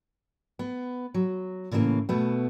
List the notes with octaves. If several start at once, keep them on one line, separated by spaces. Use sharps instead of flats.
B3
F#3
A2 C#3 E3 A3 A#3
B2 A3 B3